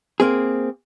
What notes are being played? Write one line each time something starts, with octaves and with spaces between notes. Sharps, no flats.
A#3 C4 G#4